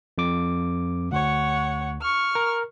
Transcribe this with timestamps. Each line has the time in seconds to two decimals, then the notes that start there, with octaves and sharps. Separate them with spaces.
0.18 F2 D6
1.12 D2 C#5 F#5
2.02 C#6 F6
2.35 A#4